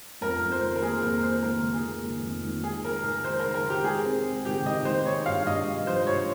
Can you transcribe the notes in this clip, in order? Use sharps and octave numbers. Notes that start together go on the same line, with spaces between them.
F2 A#4
F2
C5
D#3
A#4
A#3 G#4
F2 A#4
A#3 C5
D#3 A#4
D#3
G#4
A#3
D#3
F2
D#3
G#3 G#4
G#3 A#4
D#3 A#4
G#3 C5
A#4
D#3
A#4
D#3 G4
G#3 G#4
C4
G#3
D#3 G4
D#3 D#5
D#3 C5
G#3 C#5
G2 F5
G2 D#5
G2
F3 C5
G2 C#5